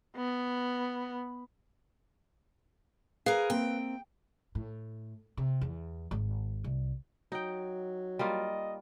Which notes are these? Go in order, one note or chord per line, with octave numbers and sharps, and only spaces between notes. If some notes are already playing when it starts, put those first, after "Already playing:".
B3
G#4 A#4 B4 F5
A#3 C4 E5 G5
A2
C3
E2
G#1
C2
F#3 D#4 G5
G3 A#3 F4 D#5